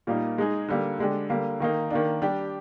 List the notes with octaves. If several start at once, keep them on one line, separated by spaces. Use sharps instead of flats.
A#2 G3 A#3 D#4
G#3 D#4 G#4
D3 G3 A#3
D3 G#3 D4 G4
D3 G3 A#3
D#3 A#3 D#4
D#3 A#3 D4
G3 D4 G4